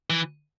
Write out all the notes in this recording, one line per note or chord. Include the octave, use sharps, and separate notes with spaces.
E3